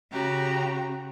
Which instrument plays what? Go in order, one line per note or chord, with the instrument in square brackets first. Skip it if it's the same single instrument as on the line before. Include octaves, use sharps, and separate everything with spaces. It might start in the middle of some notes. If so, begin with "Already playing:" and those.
[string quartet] C#3 F#4 G4 A#5